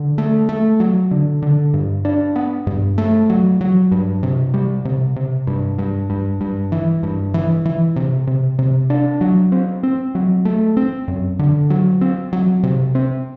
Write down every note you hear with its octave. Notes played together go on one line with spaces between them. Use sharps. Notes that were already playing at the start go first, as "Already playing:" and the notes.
Already playing: D3
A3
A3
F#3
D3
D3
G2
D4
B3
G2
A3
F#3
F#3
G2
C3
G3
C3
C3
G2
G2
G2
G2
E3
G2
E3
E3
C3
C3
C3
D4
F#3
C4
C4
F#3
A3
C4
F#2
D3
F#3
C4
F#3
C3
C4